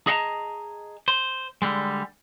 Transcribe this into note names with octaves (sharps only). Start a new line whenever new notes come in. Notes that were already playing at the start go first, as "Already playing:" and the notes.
G#4 D#5 F5 F#5 A5 A#5
C5
D3 G3 G#3